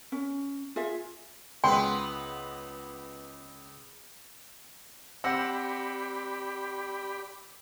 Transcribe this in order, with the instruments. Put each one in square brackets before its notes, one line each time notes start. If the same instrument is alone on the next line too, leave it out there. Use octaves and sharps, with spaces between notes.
[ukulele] C#4
F4 G#4 E5
[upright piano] C#2 [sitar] B3 B4 [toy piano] G5 [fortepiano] C6
[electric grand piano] C4 E6 A#6 [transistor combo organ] G4 D5 B5 [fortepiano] F#5